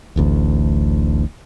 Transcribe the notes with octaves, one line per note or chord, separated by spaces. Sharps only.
D1 A1 D2